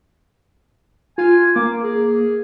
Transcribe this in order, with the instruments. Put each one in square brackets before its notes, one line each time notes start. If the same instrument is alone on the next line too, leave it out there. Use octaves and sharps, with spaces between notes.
[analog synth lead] F4 [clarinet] G#5
[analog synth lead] A#3 [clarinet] D6
[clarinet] G#4